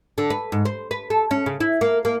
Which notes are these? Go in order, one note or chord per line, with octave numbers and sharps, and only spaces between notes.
D3
B4
G#2
C5
B4
A4
C#4
C#3
E4
A#3
A#3